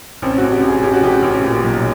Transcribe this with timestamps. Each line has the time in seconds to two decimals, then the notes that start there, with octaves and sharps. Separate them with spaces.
0.22 A1 C4
0.38 F#4
0.43 A1
0.52 G4
0.62 A1
0.68 G#4
0.83 A1 G4
0.93 F#4
1.03 A1 G4
1.22 A1
1.44 A#2
1.63 B1